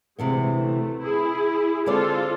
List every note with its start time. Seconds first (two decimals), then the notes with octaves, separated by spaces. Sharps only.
0.18 D2 C3 E3 G#3 B3
0.60 A3
1.02 E4 G#4
1.86 D3 G#3 C4 F4 G#4 A4 D5